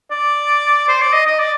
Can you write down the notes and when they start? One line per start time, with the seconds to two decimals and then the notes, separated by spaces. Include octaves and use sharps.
0.11 D5
0.88 C5
1.01 D5
1.13 D#5
1.26 D#5
1.39 D5